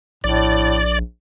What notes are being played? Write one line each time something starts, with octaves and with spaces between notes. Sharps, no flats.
A#1 A2 D5